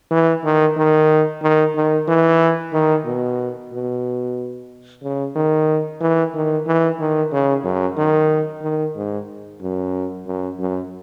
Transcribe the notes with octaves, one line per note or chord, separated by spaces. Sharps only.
E3
D#3
D#3
D#3
D#3
E3
D#3
B2
B2
C#3
D#3
E3
D#3
E3
D#3
C#3
F#2
D#3
D#3
G#2
F#2
F#2
F#2